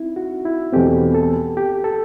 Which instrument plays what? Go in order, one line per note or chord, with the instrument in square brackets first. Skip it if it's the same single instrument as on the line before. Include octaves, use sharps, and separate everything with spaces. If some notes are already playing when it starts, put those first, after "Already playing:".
Already playing: [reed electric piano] C4 D#4 E4
F#4
E4
[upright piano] E2 B2 A3 C4 [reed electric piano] G4
[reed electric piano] A4
G4
A4